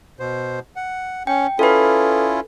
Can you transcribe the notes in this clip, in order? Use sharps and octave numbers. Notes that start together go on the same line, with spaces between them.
B2 C5
F#5
C#4 G5
C#4 E4 F4 A4 B4